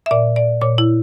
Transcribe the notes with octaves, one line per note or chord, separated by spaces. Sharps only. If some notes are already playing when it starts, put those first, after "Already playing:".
E5
A#2 D5
D5
A#2 C#5
E4